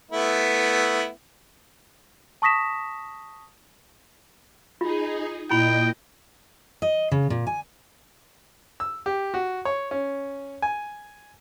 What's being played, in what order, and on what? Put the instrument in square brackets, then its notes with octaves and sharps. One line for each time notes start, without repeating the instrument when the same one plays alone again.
[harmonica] A3 B3 E4
[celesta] A5 C#6 D#6 A#6 B6 E7
[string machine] D#4 G#4 [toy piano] F4
[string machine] A#2 D#5 [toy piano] E4 B5 [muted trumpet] G5
[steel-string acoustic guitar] D#5
C#3
A#2
G#5
[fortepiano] E6
G4
F#4
C#5
C#4
G#5